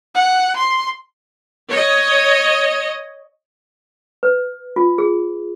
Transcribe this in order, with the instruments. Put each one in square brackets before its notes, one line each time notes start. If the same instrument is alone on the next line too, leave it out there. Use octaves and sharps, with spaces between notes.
[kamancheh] F#5
C6
[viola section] C#5 D#5
[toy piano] B4
F4
G#4